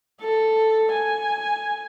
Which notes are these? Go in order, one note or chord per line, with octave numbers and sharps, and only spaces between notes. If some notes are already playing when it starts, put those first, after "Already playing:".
A4
G#5